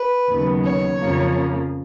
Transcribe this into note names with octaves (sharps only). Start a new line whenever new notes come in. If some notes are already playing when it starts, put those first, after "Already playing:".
Already playing: B4
D#2 C#3 F#3 B3
C#5
F2 C#3 F3 A#3